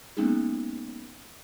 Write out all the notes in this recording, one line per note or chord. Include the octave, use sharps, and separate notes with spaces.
G#3 A#3 B3 C#4 D#4 G#4